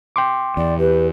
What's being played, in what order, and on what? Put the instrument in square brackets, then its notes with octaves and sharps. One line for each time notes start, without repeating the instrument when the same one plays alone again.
[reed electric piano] G5 C6 D6
[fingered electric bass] E2 [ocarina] D5
[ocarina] G4 [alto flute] B4